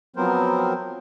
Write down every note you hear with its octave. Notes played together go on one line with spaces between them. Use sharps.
F3 F#3 B3 C4 A#4 C5